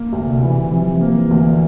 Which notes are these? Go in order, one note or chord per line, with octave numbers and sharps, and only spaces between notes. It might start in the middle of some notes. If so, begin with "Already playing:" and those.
Already playing: A#3
D2
C3
E3
C3 F3
F3
F3 A#3
E3
D2